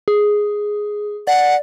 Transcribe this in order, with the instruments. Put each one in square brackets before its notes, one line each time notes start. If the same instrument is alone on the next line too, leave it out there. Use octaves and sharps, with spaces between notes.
[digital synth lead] G#4
[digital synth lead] D5 [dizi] F#5